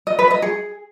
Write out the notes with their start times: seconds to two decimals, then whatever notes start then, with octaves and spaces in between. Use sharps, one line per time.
0.07 D#5
0.19 B4
0.31 D#5
0.42 G#4